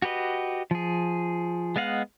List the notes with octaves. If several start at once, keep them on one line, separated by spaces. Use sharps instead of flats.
F#4 G4 B4 D#5
F3 G#4
G#3 B3 D#5 F5 F#5